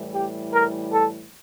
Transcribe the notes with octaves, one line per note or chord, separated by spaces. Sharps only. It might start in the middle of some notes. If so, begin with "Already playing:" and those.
Already playing: A2 E3 G3
G4
A#4
A4